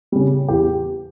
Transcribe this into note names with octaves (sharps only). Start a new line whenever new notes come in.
C#3 G3
E2 G4